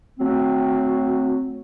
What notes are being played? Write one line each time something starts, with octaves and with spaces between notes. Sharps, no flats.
F#3 A3 C4